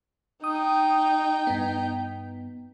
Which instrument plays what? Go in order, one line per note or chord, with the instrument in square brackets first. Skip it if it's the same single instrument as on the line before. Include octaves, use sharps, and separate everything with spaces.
[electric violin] D#4 G5 [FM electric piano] D#6
[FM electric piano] G2 B3